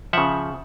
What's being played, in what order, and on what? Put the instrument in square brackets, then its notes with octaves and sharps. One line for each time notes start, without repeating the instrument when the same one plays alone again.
[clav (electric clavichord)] C#3 F3 E5 F#5